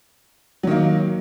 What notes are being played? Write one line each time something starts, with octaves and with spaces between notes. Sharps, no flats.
D#3 F#3 A#3